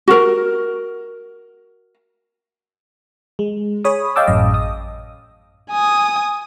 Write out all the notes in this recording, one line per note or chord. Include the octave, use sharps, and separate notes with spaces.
F#4 A#4
G#3
G#4 C#5 B5 D#6
D#5 F5 G5 A5 D6 E6
A1 F#2 D#5
D#6
G#5 D#6